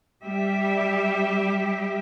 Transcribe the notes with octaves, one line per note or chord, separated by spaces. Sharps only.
G3 G4 E5